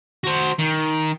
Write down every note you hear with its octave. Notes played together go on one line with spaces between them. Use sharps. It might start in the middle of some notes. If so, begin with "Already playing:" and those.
F#4 C5
D#3